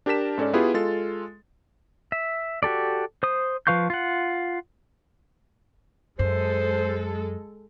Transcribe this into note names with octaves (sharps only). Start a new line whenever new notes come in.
D4 G4 A#4 A5 B6 E7
G#2 C#4 A4 D5
B3 E4 F4 G4 G#4 B4
G#3 F4 A4 A6
E5
F#4 G4 A4 D5
C5 D#6
F3 B4 F5 C#6 G6
F4 F#5
F#2 G#3 A4 C5